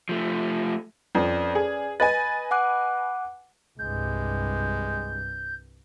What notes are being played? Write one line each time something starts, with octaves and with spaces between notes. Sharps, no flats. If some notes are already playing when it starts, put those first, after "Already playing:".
F3 A3
F2 C#4 B4 D5
G#4
B4 D#5 G#5 A6
F#5 D6 F#6
C2 G2 G#3 G6